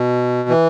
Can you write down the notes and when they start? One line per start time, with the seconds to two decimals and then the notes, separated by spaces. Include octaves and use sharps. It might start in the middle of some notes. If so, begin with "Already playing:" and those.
Already playing: B2
0.49 E3